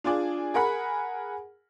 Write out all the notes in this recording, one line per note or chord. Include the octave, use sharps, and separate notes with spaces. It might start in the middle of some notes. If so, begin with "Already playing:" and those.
D4 F4 G#4 D5
G#4 A#4 F#5 B5